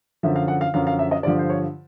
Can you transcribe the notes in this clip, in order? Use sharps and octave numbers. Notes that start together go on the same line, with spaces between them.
F#2 D3 F3 E5
F5
F#5
F5
F#2 D3 F3 F5
F5
E5
D#5
G2 D3 F3 D5
C5
C#5